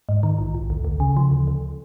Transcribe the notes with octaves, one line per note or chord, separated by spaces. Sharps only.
G#2
D#3
A#1
A#1
D2
D2
C#3
F3
D2
D2